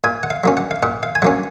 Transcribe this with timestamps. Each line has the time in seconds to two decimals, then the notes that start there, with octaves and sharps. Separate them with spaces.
0.04 A#2 G#5
0.23 F#5
0.30 F5
0.44 F#3 A#3 C#4
0.57 F#5
0.71 F5
0.83 A#2 F#5
1.03 F5
1.15 G#5
1.22 F#3 A#3 C#4 F#5